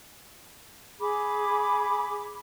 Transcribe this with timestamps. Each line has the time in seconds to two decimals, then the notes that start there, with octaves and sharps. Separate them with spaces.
1.00 G#4 B5 D6